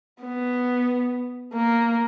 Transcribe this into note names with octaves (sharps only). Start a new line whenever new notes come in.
B3
A#3